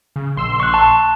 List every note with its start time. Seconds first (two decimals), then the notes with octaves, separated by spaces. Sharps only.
0.16 C#3
0.36 A#1 C6 E6
0.60 C#6 F#6
0.74 A5